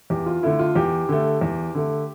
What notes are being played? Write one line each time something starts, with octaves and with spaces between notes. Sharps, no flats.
E2 G4
F4
D3 A3 E4
F4
E2 G4
D3 A3
E2
D3 A3